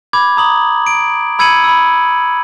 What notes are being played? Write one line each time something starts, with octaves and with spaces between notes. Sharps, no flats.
B5 D6 G#6
A#5 D#6 F#7
D7
B5 E6 G#6 C#7 D#7 F#7
B5 E6